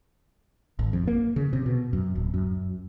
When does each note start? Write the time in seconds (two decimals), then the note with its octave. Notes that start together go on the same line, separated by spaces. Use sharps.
0.79 G#1
0.93 F2
1.07 A#3
1.36 C#3
1.53 C3
1.66 B2
1.93 F#2
2.15 D1
2.34 F#2